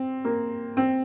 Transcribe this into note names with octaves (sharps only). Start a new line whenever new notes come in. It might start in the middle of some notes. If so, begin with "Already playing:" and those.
Already playing: C4
A#3
C4